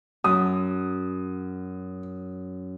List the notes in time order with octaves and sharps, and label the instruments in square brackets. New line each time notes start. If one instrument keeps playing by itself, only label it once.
[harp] F#2 [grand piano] D#6